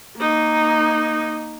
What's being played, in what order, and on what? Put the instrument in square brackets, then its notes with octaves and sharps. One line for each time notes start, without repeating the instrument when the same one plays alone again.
[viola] A#3 D#4